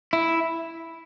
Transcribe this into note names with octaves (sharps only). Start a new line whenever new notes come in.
E4